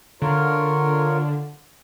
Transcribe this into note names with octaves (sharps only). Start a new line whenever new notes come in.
D3 F4 A#4 C#5